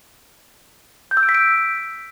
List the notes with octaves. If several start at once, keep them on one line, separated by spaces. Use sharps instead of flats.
G6
E6
D7
B6
D7